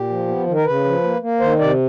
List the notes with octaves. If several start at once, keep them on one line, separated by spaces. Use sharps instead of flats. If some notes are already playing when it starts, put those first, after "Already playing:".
Already playing: A#2 G4
F3
B3
D#3
A#4
C#3 B4
F3
A#3
A#3
D#3 C5
C3 D5